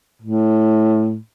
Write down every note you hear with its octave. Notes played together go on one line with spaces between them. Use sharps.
A2